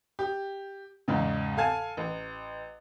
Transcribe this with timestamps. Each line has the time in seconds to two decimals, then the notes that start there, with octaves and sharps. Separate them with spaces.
0.19 G4
1.08 E2 G#2 C#3
1.57 A4 F5 G#5 A5
1.97 A1